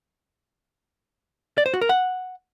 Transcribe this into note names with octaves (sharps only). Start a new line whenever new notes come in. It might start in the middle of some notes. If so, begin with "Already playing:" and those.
D5
C5
F#4
A#4
F#5